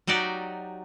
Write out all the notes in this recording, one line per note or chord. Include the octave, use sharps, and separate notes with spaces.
F#3 D#4 F#4 G4 D5